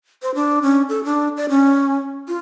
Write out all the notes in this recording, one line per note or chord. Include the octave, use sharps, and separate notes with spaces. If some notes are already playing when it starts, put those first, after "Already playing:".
C5
D4
C#4
A4
D4
D5
C#4
F4